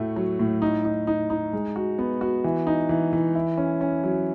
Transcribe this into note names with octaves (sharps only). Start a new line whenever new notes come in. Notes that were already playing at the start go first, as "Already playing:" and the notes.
Already playing: A2 A3 F#4
F#3
A2
D#4
D#4
D#4
D#4
G#3
F#4
B3
F#4
E3
D#4
E3
E3
E4
C#4
C#4
F#3